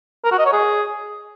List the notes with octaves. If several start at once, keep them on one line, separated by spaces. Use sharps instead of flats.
A#4
F#4
D#5
C#5
G#4